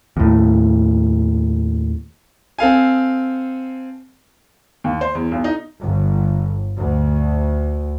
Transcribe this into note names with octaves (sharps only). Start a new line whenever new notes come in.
D#2 A2
C4 A4 F5 G#5
D#2
C5
E2
B1
D#4
G1
D2